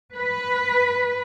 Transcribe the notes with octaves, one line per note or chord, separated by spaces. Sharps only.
B4